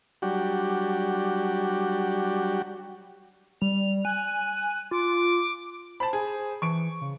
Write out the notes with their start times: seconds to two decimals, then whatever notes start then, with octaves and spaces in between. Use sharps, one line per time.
0.22 F#3 G3 D4 F#4 G4
3.62 G3 F7
4.05 G#5 F#6
4.91 F4 D6
6.00 C5 A5 B5
6.13 G#4
6.62 E3 C#6 D7
7.01 C#3